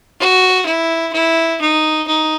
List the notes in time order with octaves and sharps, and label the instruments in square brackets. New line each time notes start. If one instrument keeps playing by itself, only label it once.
[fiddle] F#4
E4
E4
D#4
D#4